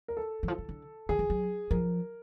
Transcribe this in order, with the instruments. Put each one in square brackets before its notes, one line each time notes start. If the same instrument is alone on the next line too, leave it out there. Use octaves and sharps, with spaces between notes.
[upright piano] A#4
A4
[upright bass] E3
F3
D#3
D3
[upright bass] D#3 [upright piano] G#4
[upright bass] E3
F#3
[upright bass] F3 [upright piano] A#4